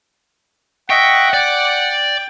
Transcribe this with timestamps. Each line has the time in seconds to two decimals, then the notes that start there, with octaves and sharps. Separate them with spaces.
0.90 D#5 E5 F#5 G5 C#6
1.34 D5 G5